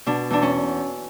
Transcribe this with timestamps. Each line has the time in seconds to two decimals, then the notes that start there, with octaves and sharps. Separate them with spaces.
0.06 B2 D4
0.30 E2 D4
0.42 C#4